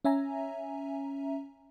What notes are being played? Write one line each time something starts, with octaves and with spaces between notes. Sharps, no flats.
C#4 E5 G#5 A#5